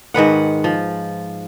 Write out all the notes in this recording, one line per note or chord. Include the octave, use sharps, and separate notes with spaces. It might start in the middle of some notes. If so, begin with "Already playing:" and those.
G#2 D#3 B4 F#5
F3